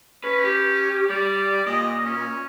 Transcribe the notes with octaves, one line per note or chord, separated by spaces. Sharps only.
C#4 B4
G4
G3 D5
A#2 D#5
C#4